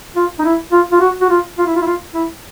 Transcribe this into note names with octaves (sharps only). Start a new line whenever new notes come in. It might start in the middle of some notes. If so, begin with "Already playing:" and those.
F4
D#4
E4
F4
F4
F#4
F#4
F4
F4
E4
F4
E4
F4
E4